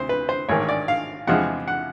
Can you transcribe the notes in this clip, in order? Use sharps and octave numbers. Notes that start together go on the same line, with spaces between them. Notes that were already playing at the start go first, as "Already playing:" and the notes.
Already playing: D2 C3 C5
B4
C5
A1 G#2 D#3 C#5
D5
F5
E2 C3 F3 G#3 F#5
F#5